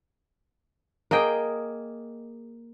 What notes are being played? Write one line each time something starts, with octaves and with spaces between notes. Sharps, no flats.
A#3 G#4 D#5 G5